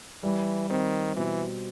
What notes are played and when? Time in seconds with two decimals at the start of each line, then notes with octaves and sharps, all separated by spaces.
0.23 E3 G3
0.70 D#3 C4
1.16 B2 E3